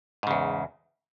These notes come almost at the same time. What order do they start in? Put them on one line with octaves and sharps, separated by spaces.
G#2 C#3 E2